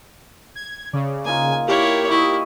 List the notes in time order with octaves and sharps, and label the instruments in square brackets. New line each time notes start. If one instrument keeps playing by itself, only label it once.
[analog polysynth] G#6
[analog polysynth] C#3 [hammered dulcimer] D5
[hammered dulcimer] A#3 D#4 F4 [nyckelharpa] G#5
[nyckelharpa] E4 C#5 [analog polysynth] G4 A#4
[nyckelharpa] E4 [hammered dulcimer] C#5 D#5 [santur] E5 C#6 D#6